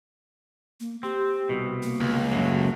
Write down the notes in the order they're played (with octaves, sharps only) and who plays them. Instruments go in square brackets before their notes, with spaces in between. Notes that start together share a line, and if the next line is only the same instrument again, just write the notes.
[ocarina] A#3
[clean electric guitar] C4 [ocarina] G4
[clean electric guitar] C2 B2
[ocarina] A#3
[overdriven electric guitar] C#2
[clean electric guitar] F#2 A2 F#3